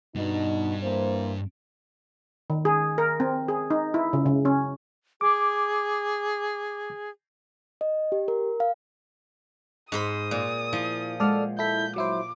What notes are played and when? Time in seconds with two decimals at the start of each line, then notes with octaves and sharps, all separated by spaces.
0.15 G2 B2 D4 D#4
0.83 E3 A#3 C5
2.50 D#3
2.65 G#4
2.98 A#4
3.20 C4
3.48 G#4
3.70 D#4
3.94 E4
4.13 C#3
4.26 C#3
4.45 C#4
5.21 G#4 D6
7.81 D#5
8.12 G4
8.28 A#4
8.60 F5
9.92 G#2 C5 B5 D#6
10.31 A#2
10.73 F3 E4
11.20 G#3 A4 D5 F#5 F6
11.59 E4 A4 G6 B6
11.96 F#3 E4 C5 D6